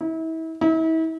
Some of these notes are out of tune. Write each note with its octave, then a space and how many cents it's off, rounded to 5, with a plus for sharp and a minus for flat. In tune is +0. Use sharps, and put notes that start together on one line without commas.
E4 -35
E4 -40